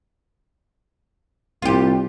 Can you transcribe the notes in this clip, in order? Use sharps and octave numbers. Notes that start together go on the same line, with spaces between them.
C2 F4 G4